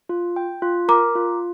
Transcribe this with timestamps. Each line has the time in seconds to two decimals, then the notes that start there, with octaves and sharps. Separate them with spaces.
0.09 F4
0.36 G5
0.62 F4
0.88 A#4 A#5 D6
1.15 F4